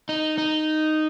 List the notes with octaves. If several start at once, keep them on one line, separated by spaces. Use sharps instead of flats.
D#4
D#4